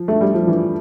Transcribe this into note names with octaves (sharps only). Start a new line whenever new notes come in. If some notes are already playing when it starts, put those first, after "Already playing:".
Already playing: F3
A3
G3
F3
E3